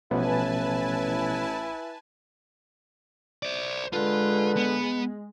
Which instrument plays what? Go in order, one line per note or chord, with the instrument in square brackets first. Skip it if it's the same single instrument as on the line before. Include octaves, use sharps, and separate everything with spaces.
[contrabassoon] A1 [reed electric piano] B2 F3 B3 [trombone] E4 [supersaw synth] B4 G#5 A5
[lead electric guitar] C5 D5
[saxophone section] D3 B4 [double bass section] G#3 [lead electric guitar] F4
[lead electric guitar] B3